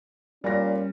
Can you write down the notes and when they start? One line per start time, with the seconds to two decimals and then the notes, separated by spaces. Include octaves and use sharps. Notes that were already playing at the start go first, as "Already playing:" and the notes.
0.44 A#2 G3 C#4 D5 A#6